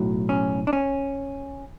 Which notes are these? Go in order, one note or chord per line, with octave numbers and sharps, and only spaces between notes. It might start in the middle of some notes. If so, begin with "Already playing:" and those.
Already playing: B1 A2 F#3
C#4
D4
C#4